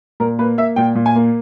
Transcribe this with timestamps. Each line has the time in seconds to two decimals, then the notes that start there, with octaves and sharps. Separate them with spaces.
0.20 A#2 A#4
0.39 A#3 B4
0.58 A#3 E5
0.76 A#2 G5
0.95 A#2
1.06 G#5
1.16 A#3